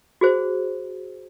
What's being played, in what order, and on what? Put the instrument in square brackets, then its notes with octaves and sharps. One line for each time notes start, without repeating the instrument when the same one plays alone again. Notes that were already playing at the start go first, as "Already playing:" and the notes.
[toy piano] F#4 G#4 C5